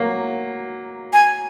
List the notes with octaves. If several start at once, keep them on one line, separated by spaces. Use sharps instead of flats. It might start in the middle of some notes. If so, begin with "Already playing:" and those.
Already playing: F#3 A#3
G#5